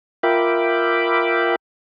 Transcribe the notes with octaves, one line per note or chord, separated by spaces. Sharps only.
F4 A#4 E5 G5 B5 D6